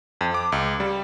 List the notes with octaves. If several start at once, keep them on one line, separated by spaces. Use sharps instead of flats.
F2
D6
C#2
G3